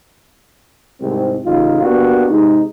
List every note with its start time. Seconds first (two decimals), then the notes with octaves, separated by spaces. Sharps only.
1.01 C2 G#2 G#3 C4
1.45 A1 C#3 D#4 F4
1.82 A#3 B3 D4 F#4 G4
2.29 C3 G#3 D#4